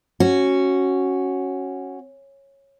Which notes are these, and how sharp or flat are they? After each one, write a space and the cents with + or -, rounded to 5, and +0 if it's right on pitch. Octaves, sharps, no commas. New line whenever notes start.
C#4 -10 F#4 +0